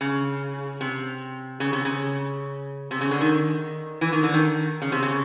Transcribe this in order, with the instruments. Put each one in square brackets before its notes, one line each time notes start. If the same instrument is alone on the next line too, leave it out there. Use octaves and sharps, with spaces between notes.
[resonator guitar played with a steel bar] C#3
C3
C#3
C3
C#3
C3
C#3
D3
D#3
E3
D#3
D3
D#3
C#3
C3
C#3